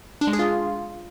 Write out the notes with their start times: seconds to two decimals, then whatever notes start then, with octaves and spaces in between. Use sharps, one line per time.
0.21 D4
0.27 G#3
0.33 G#4
0.39 F4